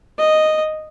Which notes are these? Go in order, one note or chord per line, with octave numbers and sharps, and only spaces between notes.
D#5